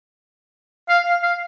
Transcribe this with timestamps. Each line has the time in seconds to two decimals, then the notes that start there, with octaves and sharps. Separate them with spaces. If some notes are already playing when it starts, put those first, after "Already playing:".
0.89 F5
1.06 F5
1.23 F5